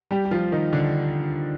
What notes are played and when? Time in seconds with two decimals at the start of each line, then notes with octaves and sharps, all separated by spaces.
0.11 G3 G4
0.25 G4
0.31 F3 F4
0.52 D#3 D#4
0.73 D3 D4